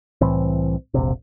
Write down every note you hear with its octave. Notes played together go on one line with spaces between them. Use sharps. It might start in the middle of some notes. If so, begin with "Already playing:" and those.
C2 A2 E3 C4
E1 A#1 C3